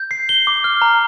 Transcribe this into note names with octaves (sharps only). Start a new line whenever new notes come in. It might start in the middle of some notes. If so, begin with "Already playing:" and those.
Already playing: G6
C7
G7
D6
F6
A#5